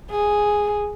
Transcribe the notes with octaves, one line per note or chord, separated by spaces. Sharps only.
G#4